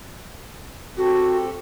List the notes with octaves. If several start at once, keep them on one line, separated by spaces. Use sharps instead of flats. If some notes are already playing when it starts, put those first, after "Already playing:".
C4 F#4 G4 A4